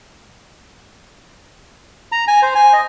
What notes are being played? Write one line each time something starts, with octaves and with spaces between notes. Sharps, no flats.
A#5
G#5
C5
G#5
D#5